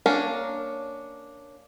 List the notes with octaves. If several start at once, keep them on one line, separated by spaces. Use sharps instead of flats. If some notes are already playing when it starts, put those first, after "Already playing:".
A#3 C#4 D4 A#4